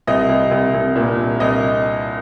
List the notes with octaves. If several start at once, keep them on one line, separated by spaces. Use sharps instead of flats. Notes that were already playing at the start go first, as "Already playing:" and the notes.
C2 D#5
C2
C2
C2
A#2
C2
C2 D#5